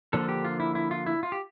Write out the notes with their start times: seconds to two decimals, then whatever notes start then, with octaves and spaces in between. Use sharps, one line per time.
0.13 D3 F3 A#3 D4 A4
0.29 G4
0.45 F4
0.60 E4
0.75 E4
0.91 F4
1.06 E4
1.23 F4
1.32 G4